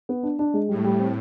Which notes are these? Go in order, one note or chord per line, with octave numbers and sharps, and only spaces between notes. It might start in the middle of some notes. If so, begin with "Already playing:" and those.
B3
D4
D4
G#3
A2 G3
G3
C4